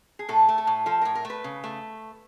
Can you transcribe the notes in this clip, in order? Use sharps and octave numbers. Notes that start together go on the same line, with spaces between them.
G#4
A2 A4
A3
A4
A2
F3 A4
A2 A#4
A#4
A3
B4
C#3
A3